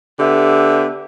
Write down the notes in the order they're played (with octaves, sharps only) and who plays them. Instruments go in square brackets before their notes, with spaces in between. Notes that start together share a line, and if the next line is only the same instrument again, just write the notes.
[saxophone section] D3 B3 G4 E5